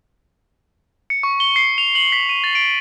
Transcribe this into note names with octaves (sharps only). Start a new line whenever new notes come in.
C#7
C#6
G7
C7
F7
F#7
B6
D#7
A6
D7